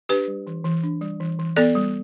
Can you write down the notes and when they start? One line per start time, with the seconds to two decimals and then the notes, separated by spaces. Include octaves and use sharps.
0.09 D4 G4 B4
0.28 G3
0.47 E3
0.64 E3
0.83 D4
1.01 G3
1.20 E3
1.39 E3
1.56 B3 A4 D5
1.75 G3